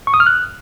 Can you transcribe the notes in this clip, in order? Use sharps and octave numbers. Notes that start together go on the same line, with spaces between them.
C#6
D#6
F6
F#6